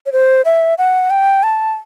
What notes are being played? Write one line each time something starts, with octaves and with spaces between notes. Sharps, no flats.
C#5
C5
E5
F#5
G5
A5